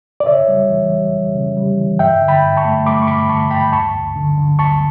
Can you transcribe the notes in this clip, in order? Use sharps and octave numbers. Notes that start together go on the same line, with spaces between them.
D5
C#3 C#5 E5
G3
E3
G3
G3
C#3
G3
E3
G2 E5 G5
D3
G5 B5
G2
A5 C#6
A3
A3 B5 D6
C#6
G2 B5 D6
D3 A5 C#6
G2 G5 B5
D2 A5 C#6
D2
D3
D3
D2 A5 C#6